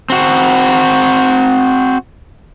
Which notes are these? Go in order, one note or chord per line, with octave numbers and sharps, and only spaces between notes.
C4 F#4